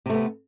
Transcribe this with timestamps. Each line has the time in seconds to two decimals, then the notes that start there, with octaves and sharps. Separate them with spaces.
0.06 C3
0.10 A3
0.13 B3